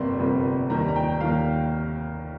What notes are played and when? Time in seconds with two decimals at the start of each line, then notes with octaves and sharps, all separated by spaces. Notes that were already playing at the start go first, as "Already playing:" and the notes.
Already playing: G1 F2 C3 G3 A#3 C6
0.18 G1 F2 C3 G3 A#3
0.70 D#2 D#3 G3 A#5
0.88 A#5
0.96 G5
1.21 D#2 D#3 G3 F5